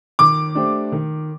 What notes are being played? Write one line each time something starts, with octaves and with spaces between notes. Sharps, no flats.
D#3 D6
A3 D4 G4 C5
D#3